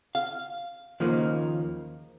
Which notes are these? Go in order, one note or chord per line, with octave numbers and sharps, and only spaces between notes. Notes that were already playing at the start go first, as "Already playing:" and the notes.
F5
D#2 C#3 F3 A#3 D#4